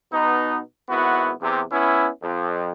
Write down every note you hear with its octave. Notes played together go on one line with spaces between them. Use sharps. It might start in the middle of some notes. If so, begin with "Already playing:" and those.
B2 B3 D#4
G#1 B3 E4 F#4
E2 C3
B3 C#4 E4
F2